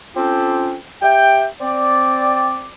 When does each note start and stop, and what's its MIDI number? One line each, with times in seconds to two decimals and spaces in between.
0.17 0.75 60
0.17 0.75 61
0.17 0.75 65
0.17 0.75 67
0.17 0.75 69
1.02 1.45 67
1.02 1.45 76
1.02 1.45 79
1.61 2.68 60
1.61 2.68 74